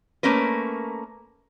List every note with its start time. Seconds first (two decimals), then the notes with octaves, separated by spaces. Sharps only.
0.23 A3 A#3 C#4 A#4 B4